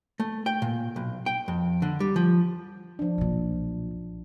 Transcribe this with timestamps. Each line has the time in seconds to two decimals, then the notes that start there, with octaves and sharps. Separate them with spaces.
0.20 A3
0.46 G5
0.62 A#2
0.96 B1
1.26 G5
1.48 F2
1.82 D3
2.00 G3
2.16 F3
2.99 F3 D4
3.18 B1 A#2